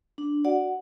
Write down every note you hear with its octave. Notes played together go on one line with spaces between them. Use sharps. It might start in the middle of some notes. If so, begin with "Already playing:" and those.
D4
F#4 D5 F#5